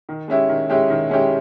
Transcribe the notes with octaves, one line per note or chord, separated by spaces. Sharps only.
D#3
G#3 C#4 E4 G4
D#3
G#3 C#4 E4 G4
D#3
G#3 C#4 E4 G4